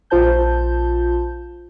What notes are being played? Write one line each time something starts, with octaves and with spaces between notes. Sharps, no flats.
A#1 F4 C5 A5 G6